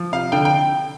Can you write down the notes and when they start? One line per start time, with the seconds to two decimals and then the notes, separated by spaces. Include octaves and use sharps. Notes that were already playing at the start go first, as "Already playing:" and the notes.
Already playing: F3
0.12 C3 F5
0.32 D3 G5
0.45 G5